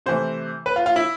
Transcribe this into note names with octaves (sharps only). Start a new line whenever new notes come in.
C3 E3 A3 C5
B4
F4
F4
E4